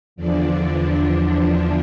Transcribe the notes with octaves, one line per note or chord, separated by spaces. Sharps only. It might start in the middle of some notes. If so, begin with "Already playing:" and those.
E2 D3 F3 D4